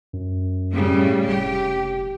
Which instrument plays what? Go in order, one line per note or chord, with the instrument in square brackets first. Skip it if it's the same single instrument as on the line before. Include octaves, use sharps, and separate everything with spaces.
[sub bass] F#2
[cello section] A2 C#3 G3
[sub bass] F1 [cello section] G4